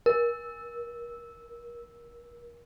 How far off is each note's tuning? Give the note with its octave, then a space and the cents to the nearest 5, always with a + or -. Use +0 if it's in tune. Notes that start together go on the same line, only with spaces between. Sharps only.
A#4 +30